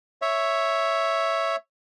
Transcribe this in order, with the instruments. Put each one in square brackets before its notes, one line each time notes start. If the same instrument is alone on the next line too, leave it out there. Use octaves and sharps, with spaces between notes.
[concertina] C#5 E5